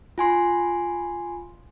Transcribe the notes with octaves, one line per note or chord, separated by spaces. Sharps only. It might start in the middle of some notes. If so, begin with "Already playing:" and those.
F4 G#5 C6